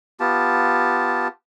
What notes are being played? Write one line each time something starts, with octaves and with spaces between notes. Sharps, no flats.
B3 F4 G4 A5